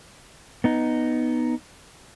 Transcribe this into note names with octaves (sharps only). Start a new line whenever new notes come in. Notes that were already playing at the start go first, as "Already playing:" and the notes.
B3 D#4